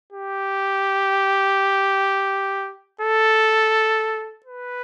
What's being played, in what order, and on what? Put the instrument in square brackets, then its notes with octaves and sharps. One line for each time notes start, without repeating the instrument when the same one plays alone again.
[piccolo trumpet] G4
A4
B4